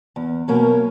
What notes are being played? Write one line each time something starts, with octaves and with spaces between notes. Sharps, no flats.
E2
B2 F#3 A#3 C#4